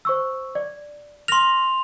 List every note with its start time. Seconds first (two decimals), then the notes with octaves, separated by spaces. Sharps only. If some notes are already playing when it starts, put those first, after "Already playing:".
0.05 C5 C#6 E6
0.55 D5
1.28 C6 F6 A#6 F7